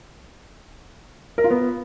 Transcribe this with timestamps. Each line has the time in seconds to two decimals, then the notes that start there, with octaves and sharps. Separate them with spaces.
1.38 A#4
1.44 F4
1.50 B3